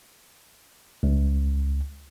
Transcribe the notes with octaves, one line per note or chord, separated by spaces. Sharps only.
C#2